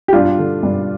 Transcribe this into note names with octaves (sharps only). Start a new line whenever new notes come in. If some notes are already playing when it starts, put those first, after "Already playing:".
G4
G2 D4 F4
D3
G2